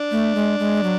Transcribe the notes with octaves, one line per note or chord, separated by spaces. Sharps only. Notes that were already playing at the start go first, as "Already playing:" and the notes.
Already playing: D4
A3
G#3
G#3
F#3